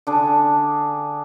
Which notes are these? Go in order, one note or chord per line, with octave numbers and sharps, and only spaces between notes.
D3 D4 G#4